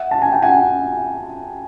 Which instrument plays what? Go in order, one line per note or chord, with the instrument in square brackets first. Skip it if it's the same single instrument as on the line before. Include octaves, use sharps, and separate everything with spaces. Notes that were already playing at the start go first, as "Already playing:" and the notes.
Already playing: [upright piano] E5 F#5
A5
G#5
G5
F#5 G#5